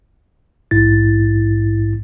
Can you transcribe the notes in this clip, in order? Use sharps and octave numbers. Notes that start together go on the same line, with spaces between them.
A#1 G#2 E4 A6